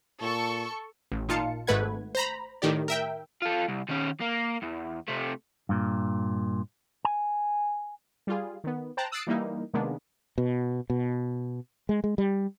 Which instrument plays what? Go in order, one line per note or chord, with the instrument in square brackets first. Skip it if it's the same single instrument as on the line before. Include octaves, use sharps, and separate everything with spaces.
[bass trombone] A#2 [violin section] A4 C#6
[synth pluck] A1
A#2 D#4 F4 F5 A5 C#7
G#1 G#2 A3 B4 F#5 G#6
C5 A#5 B5
A2 D#3 G4 D5
A#4 E5 G5
[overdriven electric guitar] F4 A4
C2
D#3 C#4
A#3
E2
C3 A3
[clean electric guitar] G2 A#2
G#5
[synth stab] G3 F4 G#4
D#3 B3
C5 G5 A5 A#5 F#6
D#6 E6 F#6 A6 C7 D7
E3 G3 A#3 D#4 E4
C3 D#3 G#3 A#3 B3 D4
[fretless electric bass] B2
B2
G#3
G#3
G3